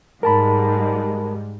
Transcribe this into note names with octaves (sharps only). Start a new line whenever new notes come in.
G#2 G3 G#3 A#4 A5 B5